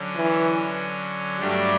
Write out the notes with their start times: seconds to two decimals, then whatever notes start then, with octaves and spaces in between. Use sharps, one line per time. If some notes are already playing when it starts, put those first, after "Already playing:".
Already playing: D3 F#3 C#4
0.16 E3
1.40 G2 F#3 G3 A3 D4 G4